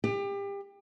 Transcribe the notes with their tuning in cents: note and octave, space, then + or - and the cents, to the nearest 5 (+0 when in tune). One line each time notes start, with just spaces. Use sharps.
G4 +30